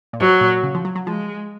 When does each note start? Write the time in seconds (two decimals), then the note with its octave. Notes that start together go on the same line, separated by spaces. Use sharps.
0.13 A#2
0.20 G#2 F#3
0.41 A#2
0.63 C#3
0.75 F3
0.85 F#3
0.95 F#3
1.07 F3 G#3